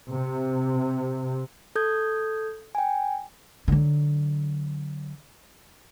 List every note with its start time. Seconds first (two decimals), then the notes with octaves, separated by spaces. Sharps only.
0.11 C3
1.76 A4 D#6 G6 G#6
2.75 G5 G#5
3.68 D3 F#3